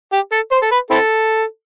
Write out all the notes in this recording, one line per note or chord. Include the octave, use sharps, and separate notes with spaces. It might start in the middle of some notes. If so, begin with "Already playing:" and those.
G4
A4
C5
A4
B4
C4 E4 A4